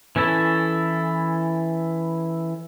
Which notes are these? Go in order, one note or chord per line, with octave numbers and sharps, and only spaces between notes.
E3 C#4 E4 A4